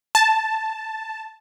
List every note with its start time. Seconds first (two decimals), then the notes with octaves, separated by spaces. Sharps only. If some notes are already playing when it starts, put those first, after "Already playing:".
0.15 A5